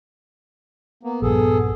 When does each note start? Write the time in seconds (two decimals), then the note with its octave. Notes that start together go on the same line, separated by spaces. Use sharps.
1.03 A#3 B3
1.22 A#1 G2 B3 G#4 A4